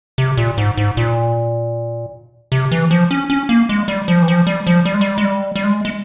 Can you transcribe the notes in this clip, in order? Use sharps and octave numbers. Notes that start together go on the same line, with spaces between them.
C3
A#2
G#2
G#2
A#2
C3
E3
F3
C#4
C#4
A#3
G#3
G3
F3
E3
F3
G3
F3
G3
G#3
G3
G#3
G3
G3
G#3
G#3